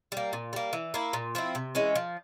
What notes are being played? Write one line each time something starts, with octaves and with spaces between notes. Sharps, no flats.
G3 A#3
A#2
G3 A#3
E3
A#3 E4
A#2
F3 C4 E4
C3
E3 G#3 C#4
F3